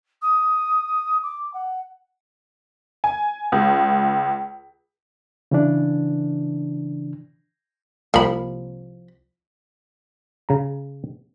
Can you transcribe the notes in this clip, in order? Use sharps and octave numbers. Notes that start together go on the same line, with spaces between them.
D#6
D6
F#5
G#5
C#2
C#3 E3 D4
C2 F3 A#3 B5
C#3 A#5